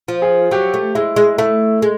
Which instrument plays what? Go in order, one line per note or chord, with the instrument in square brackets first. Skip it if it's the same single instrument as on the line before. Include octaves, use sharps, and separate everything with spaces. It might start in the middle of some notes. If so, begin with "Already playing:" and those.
[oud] F3
[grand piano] G#4
[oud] F#3 [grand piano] G4
[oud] A3
[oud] G#3 [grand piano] E4
[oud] G#3
[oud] A3 [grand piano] E4
[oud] G#3